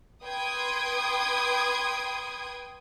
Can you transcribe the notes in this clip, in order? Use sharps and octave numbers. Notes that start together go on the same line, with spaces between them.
B4 G5 C6 D#6 G#6